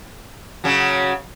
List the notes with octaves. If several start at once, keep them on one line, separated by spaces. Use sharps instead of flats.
C#3 F#3